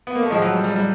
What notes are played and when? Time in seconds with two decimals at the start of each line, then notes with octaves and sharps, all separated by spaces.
0.07 B3
0.15 A#3
0.23 A3
0.30 A2 F3 G#3
0.42 F#3
0.53 G3
0.64 G3
0.76 G3